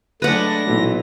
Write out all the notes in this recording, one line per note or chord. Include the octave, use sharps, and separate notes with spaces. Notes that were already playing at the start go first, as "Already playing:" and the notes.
F#3 G#3 A3 D4 B4 F#5 A#6
B1 A#2 E3